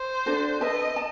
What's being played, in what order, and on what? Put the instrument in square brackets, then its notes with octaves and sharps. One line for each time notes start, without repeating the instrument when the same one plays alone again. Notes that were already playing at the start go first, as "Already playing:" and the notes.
Already playing: [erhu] C5
[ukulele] D4 F#4 A4
[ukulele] B4 E5 A5 [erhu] D#5
[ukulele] A5